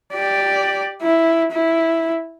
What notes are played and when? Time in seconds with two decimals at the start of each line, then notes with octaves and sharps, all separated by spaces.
0.13 G4 D5
1.02 E4
1.52 E4